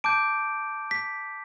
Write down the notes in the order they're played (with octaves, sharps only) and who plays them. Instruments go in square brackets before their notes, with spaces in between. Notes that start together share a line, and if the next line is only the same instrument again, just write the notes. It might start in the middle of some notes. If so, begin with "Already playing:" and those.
[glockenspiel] A5 D6 G6 D7
B6